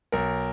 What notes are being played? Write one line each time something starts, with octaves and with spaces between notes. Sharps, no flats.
B1 A#4